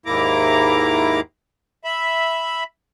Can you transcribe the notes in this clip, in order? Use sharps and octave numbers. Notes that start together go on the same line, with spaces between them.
D#2 G#2 A#3 E4 A#5 D6
E5 B5